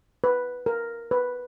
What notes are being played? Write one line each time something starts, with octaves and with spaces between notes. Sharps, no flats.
B4
A#4
B4